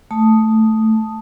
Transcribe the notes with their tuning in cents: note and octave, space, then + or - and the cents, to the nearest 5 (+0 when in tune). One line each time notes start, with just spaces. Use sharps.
A3 +0 A5 +0 D#6 +0